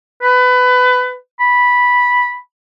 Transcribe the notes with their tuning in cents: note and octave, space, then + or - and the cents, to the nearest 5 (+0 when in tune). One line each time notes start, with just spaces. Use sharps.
B4 +20
B5 -10